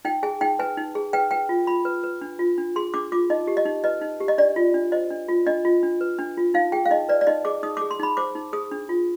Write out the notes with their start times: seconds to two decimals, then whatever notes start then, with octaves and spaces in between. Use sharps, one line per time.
0.05 D#4 G5
0.23 G#4 G#5
0.41 D#4 G5
0.59 B4 G#5
0.77 D#4
0.95 G#4
1.13 B4 G5
1.31 B4 G5
1.49 F4
1.67 F4 B5
1.85 B4
2.03 B4
2.21 D4
2.39 F4
2.58 D4
2.76 G#4 C6
2.94 D4 D6
3.12 F4 D6
3.30 D#4 D#5
3.47 G4
3.57 D#5
3.65 D#4
3.84 B4 D#5
4.01 D#4
4.20 G4
4.28 D#5
4.38 D4 D5
4.56 F4
4.74 D4
4.92 C5 D#5
5.11 D4
5.29 F4
5.47 D4 D#5
5.65 F4
5.83 D4
6.01 B4
6.19 D4
6.37 F4
6.54 D#4 F5
6.72 G#4 G5
6.86 F5
6.91 D#4 D#5
7.09 B4 D5
7.21 D5
7.27 D#4 D#5
7.45 G#4 D6
7.63 D#4 D#6
7.77 G#4 D6
7.91 C6
7.99 D#4 B5
8.17 C5 D6
8.35 D#4
8.53 G#4 D#6
8.71 D4
8.89 F4